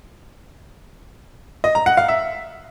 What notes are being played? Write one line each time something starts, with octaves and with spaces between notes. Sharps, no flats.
D#5
A#5
F#5
F5
E5